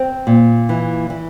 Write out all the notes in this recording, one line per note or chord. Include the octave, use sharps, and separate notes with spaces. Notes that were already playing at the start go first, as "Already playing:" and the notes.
Already playing: C4
A#2
E3
E3